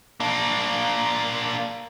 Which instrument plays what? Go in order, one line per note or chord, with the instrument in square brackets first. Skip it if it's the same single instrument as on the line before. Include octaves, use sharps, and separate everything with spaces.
[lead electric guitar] A#3 D4